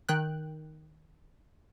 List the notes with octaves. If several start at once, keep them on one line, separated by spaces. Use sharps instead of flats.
D#3 G5 F#6